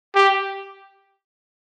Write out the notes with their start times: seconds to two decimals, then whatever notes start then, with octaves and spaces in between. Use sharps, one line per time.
0.15 G4